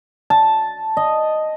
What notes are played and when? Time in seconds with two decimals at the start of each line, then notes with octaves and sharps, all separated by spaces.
0.30 A5
0.97 D#5